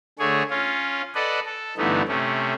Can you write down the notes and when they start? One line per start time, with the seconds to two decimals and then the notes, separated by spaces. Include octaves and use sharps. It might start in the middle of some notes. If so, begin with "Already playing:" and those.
0.19 D3 A3 G#4 C#5
0.50 C#4 F4
1.15 A4 B4 D5 D#5 F#5
1.46 A4
1.77 G2 D3 E3 A3 B3 D#4
2.08 C3 A3 C#4